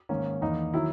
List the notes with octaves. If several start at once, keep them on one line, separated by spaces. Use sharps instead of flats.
G#2 D#3 A#3 C#4
E2 D#3 A#3 D#4
D#3 F#3 E4